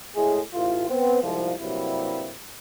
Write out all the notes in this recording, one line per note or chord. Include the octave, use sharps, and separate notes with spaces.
A2 G#3 G#4
A1 A2 A3 F4
B3 C4
C2 G#2 F3
G2 C3 F#3 G3 A#3 E4